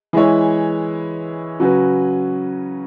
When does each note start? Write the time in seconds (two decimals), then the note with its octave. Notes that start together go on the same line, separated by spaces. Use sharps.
0.13 E3 G#3 E4 C#5
1.59 C#3 F#3 C#4 F#4 B4